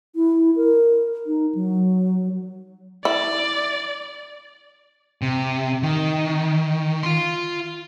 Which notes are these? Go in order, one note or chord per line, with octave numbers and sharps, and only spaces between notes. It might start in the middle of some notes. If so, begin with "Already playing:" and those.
E4
A#4
D#4
F#3
E4 D5
C3
D#3
F4 C6